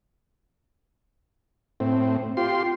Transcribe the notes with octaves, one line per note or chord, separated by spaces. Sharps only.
A2 C4
F4 G4 C6